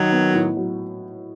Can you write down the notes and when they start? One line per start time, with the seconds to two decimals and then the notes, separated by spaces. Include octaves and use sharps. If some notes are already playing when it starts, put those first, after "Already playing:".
Already playing: D#3 F#3 D#4
0.12 B3
0.34 A2
0.57 F#3